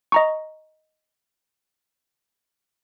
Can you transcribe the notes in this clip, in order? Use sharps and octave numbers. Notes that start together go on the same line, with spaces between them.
D#5 A#5 C#6